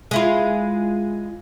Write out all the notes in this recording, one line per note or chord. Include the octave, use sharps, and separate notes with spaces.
G#3 E4 F4